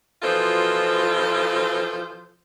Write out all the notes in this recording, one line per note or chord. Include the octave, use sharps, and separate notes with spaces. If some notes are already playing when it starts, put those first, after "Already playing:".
B2 E3 F3 F4 A4 C5